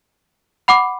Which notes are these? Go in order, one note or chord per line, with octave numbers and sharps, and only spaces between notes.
F#5 B5 D6